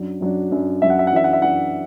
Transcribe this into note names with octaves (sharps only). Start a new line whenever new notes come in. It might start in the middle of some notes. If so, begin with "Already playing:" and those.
Already playing: F#2 F#3 D4
F#2 F#3 D4
F#2 F#3 D4
F#2 F#3 D4 E5
F#5
E5
F#5
F#2 E3 D4 E5
F#5
E5
F#2 E3 D4 F#5